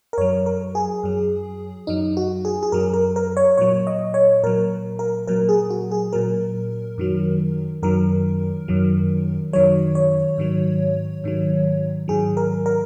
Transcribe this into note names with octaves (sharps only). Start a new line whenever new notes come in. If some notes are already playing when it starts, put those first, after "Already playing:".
A#4
F#2 F#3 C#5
A#4
G#4
F#2 F#3
F#2 F#3 D#4
F#4
G#4
G#4
F#2 F#3 A#4
A#4
A#4
C#5
A#2 F#3 C#5
D#5
C#5
A#2 F#3 A#4
A#4
A#2 F#3 A#4
G#4
F#4
G#4
A#2 F#3 A#4
F#2 D#3 F#3
F#2 D#3 F#3 A#4
F#2 D#3 F#3
F#2 D#3 F#3 C#5
C#5
G#2 D#3 F#3
G#2 D#3 F#3
G#2 D#3 F#3 G#4
A#4
A#4